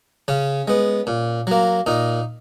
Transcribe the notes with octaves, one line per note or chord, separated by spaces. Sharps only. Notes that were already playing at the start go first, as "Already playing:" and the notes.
C#3 C#4
G#3 B3
A#2
F#3 A#3
A#2 D#4